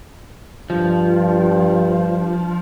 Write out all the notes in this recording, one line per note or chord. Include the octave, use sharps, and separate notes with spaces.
G2 F3